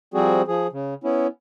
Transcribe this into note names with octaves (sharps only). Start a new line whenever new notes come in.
F3 G3 C4 F#4 G#4
F3 G#4
C#3
B3 C#4 E4